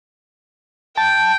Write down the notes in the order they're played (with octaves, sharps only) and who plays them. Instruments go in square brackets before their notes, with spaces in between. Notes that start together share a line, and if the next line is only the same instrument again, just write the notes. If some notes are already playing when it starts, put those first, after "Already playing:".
[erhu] G5 [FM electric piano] A5